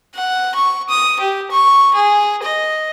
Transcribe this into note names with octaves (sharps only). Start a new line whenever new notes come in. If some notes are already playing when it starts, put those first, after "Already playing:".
F#5
C#6
D#6
G4
C#6
G#4
D#5